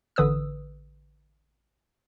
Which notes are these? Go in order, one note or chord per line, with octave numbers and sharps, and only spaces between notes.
A1 D3 B4 D#6 E6